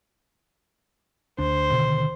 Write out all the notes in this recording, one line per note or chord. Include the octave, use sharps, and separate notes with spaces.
D2 D4 C5
B2 D3 D#3